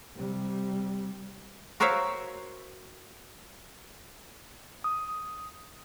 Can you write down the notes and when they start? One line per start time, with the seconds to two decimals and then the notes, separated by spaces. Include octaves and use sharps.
0.15 C3 G3
1.80 F#4 A#4 C5 C#5 E5 F5
4.84 D#6